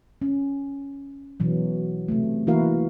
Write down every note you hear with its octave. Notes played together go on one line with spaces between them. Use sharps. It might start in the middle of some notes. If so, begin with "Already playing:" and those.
C#4
B2 E3 F#3
C3 A3
E3 A#3 E4 F#4 A#4 F5